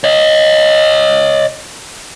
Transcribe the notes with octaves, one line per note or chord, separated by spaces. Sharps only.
C#5 D#5